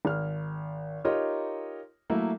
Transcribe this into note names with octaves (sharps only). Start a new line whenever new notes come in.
G#1 F6
D#4 F4 G4 A#4 C#5 D#5
F#3 A3 A#3 E4